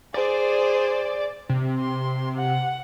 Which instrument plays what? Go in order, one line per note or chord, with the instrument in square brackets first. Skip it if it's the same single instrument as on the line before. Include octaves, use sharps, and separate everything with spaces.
[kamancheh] G#4 C5 [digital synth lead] D5
[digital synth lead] C3
[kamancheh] C6
F#5